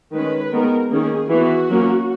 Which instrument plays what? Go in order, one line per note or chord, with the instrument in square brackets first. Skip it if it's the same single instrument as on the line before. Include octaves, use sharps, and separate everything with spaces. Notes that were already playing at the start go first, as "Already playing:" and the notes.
[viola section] D#3 G#3 C#4 B4
D#3 G#3 B3 A#4
D#3 A#3 C#4 G#4
E3 B3 F#4
F#3 A#3 C#4